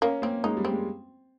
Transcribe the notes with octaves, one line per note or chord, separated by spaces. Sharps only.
A#3 C#4
A#3 C4
G#3 D#4
G3
C4
G#3